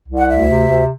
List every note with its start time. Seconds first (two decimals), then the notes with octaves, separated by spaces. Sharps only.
0.09 C2
0.17 F#5
0.29 D2 E5
0.48 C3
0.68 D2